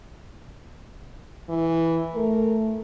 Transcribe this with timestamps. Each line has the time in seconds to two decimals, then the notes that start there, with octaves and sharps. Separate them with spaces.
1.49 E3
2.15 A3 A#4